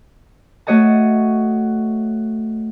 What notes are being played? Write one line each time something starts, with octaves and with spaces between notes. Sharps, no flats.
A3 F#4 C#5 D#5 A5